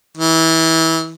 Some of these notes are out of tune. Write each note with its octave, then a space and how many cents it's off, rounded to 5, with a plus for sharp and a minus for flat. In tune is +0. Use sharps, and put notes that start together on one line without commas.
E3 -25